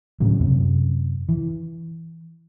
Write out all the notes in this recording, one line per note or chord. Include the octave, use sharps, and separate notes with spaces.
A2 C#3 F#3
F#2 C3
E3